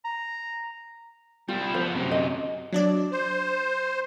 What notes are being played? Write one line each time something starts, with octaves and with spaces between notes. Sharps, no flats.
A#5
G3 E4 F4
F3 B3 C5
F#2 C3
D#5
F#3 D4 D5
C5